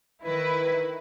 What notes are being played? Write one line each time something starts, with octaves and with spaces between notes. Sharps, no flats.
D#3 E4 B4